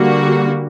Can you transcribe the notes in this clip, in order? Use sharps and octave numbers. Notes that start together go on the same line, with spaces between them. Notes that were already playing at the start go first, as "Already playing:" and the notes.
Already playing: D3 G3 A#3 F#4